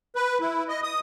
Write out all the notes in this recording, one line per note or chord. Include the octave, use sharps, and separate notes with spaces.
B4
E4
D#5
D#6